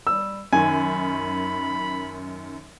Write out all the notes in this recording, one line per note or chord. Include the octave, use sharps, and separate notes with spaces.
G3 E6
F#2 D#3 G#5 B5